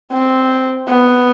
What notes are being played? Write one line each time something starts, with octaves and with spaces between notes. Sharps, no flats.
C4
B3